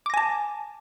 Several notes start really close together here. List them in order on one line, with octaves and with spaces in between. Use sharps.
D6 A#6 G#5 A5